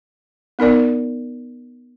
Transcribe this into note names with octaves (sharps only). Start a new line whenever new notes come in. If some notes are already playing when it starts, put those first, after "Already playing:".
B3 D#4 A#4 D5